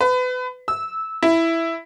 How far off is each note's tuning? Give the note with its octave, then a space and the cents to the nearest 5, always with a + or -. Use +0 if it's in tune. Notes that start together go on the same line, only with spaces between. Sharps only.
B4 +30
E6 -15
E4 +0